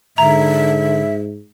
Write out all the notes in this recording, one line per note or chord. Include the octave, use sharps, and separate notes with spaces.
G#2 D3 E5 A#5